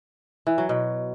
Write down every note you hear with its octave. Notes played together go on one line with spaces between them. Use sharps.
E3
F#3
B2